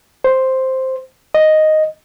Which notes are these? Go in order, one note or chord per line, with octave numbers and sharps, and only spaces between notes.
C5
D#5